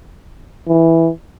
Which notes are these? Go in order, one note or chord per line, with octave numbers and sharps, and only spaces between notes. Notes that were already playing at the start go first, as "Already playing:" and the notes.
E3